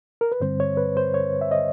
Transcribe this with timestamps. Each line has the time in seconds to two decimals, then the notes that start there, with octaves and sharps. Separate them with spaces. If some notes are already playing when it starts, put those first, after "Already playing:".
0.21 A#4
0.32 B4
0.40 G2 D3 G3 C4 C5
0.60 C#5
0.77 B4
0.97 C5
1.14 C#5
1.41 E5
1.51 D#5